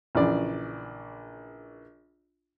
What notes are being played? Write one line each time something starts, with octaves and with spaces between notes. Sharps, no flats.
A#1 C#3 E3 G#4 D5